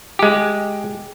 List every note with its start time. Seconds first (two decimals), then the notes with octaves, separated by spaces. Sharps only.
0.19 G#3 G4